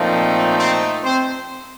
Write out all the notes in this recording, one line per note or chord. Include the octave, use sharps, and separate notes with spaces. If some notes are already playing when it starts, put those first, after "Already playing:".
Already playing: A#2 F3 A3 C4 D#4
C4 C5
C4 C5